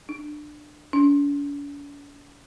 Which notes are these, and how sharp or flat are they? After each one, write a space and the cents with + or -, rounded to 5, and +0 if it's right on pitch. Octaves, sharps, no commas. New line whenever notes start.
D4 +20
D4 -45